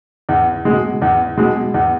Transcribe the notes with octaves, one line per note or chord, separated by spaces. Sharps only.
E2
B2 G#3
E2
B2 G#3
E2